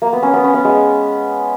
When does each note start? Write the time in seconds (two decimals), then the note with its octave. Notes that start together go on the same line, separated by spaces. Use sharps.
0.02 A#3
0.13 B3
0.23 C#4
0.34 B3
0.44 C#4
0.54 B3
0.65 G#3